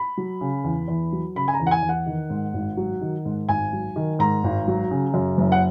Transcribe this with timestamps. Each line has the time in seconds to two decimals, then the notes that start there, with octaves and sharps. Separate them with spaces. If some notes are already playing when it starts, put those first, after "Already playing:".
Already playing: B5
0.17 F#3
0.41 C#3
0.64 E2
0.88 E2
1.12 F#3
1.35 C#3 B5
1.48 G#5
1.54 A#5
1.60 E2
1.67 F#5
1.71 G#5
1.82 E2
1.89 F#5
2.06 D#3
2.30 G#2
2.54 G#1
2.77 F#3
3.01 D#3
3.25 G#2
3.49 G#1 G#5
3.73 F#3
3.96 D#3
4.19 G#2 A#5
4.44 G#1
4.68 F#3
4.91 C#3
5.14 F#2
5.38 F#1
5.52 F#5